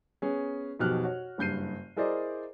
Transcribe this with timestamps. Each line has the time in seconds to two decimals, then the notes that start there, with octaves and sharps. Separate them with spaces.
0.22 B3 C#4 G#4
0.79 B1 F2 B2 G4 F6 F#6
1.04 F#4 C#5
1.38 F#1 G2 G6 C7 D#7
1.96 E4 G#4 A#4 C5 D5 D#5